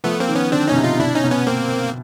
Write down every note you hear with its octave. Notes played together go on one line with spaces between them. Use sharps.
F3 A3 B3
A#3 C4
D#3
B3 C#4
D3 C4 D4
B2 C#4 D#4
C3
D#4 F4
B2 D4 E4
C#4 D#4
B2
B3 C#4
A#3 C4